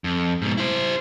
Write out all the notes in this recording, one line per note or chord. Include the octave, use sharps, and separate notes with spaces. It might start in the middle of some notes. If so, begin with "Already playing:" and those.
F2
G#2 B2
E4 C5